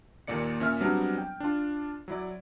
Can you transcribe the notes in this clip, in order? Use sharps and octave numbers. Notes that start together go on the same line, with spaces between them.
D#2 A#2 A#3 D5 C#7
A#2 C#4 E5 F6
F#3 G3 B3 C4 D4
G5
D4 F4
F#3 E4 D5